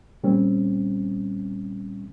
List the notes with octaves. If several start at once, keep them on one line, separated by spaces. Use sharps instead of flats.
A#2 G3 C4 C#4